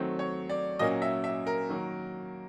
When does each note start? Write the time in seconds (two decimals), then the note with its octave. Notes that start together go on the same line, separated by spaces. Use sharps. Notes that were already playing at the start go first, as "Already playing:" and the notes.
Already playing: D#3 F#3 A3 C4
0.19 C#5
0.49 D5
0.79 A#2 F#3 A#3 C#4 D#5
1.02 E5
1.24 E5
1.47 A#4
1.69 D#3 F#3 A#3